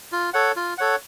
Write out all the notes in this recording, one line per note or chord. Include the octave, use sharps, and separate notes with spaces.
F4
A4 C#5 F#5
F4
A4 C#5 F#5